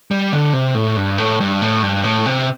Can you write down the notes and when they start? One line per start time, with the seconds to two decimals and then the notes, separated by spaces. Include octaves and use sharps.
0.11 G3
0.32 D3
0.53 C3
0.75 A2
0.97 G2
1.18 A2
1.40 G2
1.61 A2
1.83 G2
2.04 A2
2.26 C3